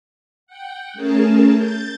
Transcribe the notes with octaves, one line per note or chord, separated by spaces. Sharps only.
F#5 G5
A3 C#4 G#4 A#4 A5
G6 A6